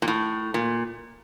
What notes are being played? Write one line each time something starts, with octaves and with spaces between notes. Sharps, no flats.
A#2
A2
A#2